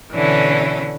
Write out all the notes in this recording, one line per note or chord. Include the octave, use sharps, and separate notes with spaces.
B2 D3 E3 C#4 E4